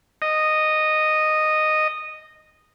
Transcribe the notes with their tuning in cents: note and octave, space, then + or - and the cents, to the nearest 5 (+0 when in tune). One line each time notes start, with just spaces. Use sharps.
D#5 -10